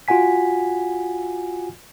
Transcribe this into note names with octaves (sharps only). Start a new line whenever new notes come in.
F4 F#4 F#5 G#5 B6